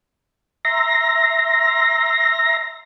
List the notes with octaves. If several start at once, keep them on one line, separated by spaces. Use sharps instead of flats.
E5 A#5 C6 A#6